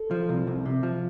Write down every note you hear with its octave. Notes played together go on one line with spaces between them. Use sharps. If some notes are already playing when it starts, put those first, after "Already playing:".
Already playing: A4
F3
C2
C2
C3
F3